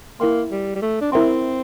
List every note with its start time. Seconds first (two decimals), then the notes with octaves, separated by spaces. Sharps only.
0.20 A#3 E4 A#4 E5 G5 C6
0.51 G3
0.75 G3
0.82 A3
1.01 D4
1.12 C4 E4 A#4 E5 G5 C6